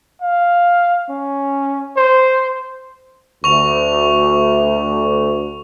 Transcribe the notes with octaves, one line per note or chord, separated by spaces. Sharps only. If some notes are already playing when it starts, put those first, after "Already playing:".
F5
C#4
C5
D2 C#6 F7